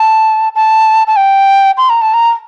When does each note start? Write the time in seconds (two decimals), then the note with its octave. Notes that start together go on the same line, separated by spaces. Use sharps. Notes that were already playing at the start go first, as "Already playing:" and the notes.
Already playing: A5
0.55 A5
1.07 A5
1.16 G5
1.77 C6
1.89 A#5
2.02 A5
2.14 A#5